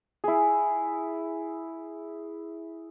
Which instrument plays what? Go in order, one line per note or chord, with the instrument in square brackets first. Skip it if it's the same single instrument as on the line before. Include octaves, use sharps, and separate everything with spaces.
[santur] E4 G#4